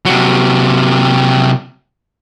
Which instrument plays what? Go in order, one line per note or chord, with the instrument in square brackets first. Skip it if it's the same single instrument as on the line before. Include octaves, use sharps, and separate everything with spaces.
[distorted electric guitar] C3 F#3